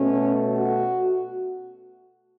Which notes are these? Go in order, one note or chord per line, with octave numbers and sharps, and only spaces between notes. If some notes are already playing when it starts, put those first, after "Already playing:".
Already playing: B2 A3 C#4
F#4